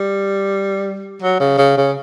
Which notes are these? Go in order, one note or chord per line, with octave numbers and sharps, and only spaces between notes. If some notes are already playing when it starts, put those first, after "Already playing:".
Already playing: G3
F#3
C#3
C#3
C#3